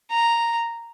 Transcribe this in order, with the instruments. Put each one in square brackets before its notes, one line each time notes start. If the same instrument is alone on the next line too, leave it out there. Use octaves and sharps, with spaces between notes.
[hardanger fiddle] A#5